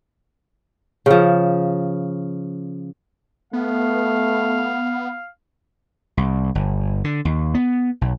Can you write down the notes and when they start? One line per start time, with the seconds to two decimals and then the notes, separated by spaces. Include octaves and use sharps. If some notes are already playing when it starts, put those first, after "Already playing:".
1.06 C#3 F3
3.53 A3 B3 F5
6.17 C2
6.55 G1
7.04 D3
7.25 D#2
7.54 B3
8.01 B1